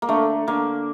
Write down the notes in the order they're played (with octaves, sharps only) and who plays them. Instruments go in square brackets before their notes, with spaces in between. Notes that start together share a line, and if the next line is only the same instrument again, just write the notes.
[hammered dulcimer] A#3
[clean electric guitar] D3 [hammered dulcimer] A3
[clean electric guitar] D3 [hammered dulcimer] A#3